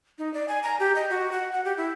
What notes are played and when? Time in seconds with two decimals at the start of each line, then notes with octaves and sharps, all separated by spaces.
0.18 D#4
0.34 D5
0.48 G#5
0.63 A#5
0.80 G4
0.95 D#5
1.10 F#4
1.32 F#5
1.52 F#5
1.65 G4
1.77 E4